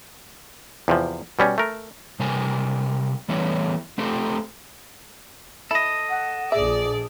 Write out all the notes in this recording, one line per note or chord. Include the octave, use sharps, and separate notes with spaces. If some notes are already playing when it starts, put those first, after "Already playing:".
E2 C3 F3
B2 G3 C#4
A3 A#4
C3 G3 A#4 G#5
E3 G3 A3 B3 E4 C#5
A3 C4 G4 A4 C5
E4 A4 D#5
F#5
A#1 G#4 D5 E5